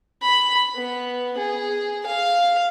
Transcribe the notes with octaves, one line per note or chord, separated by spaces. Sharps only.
B5
B3
G#4
F5